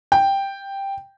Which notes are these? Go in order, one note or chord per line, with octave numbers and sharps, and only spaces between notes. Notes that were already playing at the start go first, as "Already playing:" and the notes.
G5